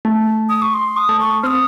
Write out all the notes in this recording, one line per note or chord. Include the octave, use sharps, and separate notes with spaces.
A3
D#6
C#6
C6
D#6
A3
C#6
C4 D#6 F6